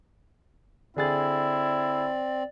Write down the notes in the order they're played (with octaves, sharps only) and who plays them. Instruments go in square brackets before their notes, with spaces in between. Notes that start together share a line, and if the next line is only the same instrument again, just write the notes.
[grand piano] D3 G#4 A6 [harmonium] C4 [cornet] E4 [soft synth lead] D5